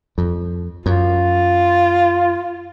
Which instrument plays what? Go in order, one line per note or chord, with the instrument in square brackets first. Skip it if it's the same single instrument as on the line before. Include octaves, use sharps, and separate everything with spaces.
[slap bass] F2
[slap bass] F#2 [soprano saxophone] F4